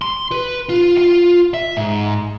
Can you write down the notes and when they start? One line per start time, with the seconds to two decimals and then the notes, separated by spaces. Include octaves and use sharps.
0.02 C6
0.32 B4
0.69 F4
0.97 F4
1.54 E5
1.77 G#2